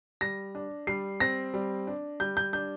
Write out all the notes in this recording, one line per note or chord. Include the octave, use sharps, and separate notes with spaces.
G3 A#6
D4
G3 C7
C4 A#6
G3
D4
G3 G6
G6
D4 G6